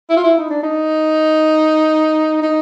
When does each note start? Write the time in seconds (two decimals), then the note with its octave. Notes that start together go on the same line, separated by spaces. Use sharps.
0.10 E4
0.17 F4
0.24 E4
0.38 D#4
0.50 D4
0.63 D#4
2.42 D#4